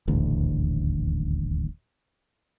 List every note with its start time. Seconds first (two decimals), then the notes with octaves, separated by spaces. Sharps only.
0.08 D#1 A1 D2